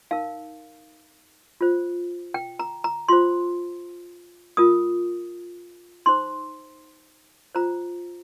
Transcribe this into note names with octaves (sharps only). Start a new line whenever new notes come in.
D#4 A#4 F5
F4 C5
G5
A#5
A#5
F4 C5 C6
F4 A#4 D#6
D#4 C5 C6
F4 C5 A#5